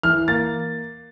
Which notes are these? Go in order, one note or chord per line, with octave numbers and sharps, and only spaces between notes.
E3 F6
A#3 A6